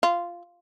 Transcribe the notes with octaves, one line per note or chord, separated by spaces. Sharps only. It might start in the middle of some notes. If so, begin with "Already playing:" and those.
F4